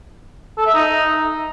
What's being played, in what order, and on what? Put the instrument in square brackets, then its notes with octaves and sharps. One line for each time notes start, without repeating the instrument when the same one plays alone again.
[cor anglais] A4
E5
D#4